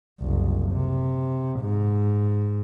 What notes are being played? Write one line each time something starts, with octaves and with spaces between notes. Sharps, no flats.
F#1 C2
C3
G#2